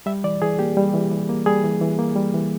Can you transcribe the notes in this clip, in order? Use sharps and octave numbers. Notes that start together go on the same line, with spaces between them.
G3 E5
E3 D5
E3 G#4
A#3 G4
G3
E3
E3
A#3
G3 G#4
E3
E3
A#3
G3
E3